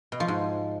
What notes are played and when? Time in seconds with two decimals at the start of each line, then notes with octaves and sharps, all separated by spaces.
0.12 B2
0.20 F3
0.28 G#2